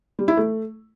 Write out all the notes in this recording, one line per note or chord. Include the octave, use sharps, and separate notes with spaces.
G3
E4
A3